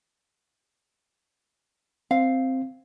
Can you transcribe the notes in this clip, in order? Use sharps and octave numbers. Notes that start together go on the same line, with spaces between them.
C4 F5